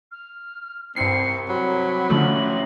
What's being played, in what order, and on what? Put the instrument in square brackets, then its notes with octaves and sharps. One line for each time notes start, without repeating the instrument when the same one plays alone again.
[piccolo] F6
[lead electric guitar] C2 [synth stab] G2 C7 [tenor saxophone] C4 [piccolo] C#7
[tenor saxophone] F#3 [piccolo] B5
[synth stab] D3 F3 A3 [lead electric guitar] C#4 E4 [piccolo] F#7